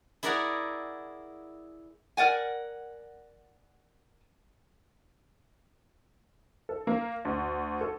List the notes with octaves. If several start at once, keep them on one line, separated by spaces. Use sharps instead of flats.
E4 G#4 A#4 D5 F#5 A#5
A#4 D5 F#5 G#5
A4
A#3
D2
A4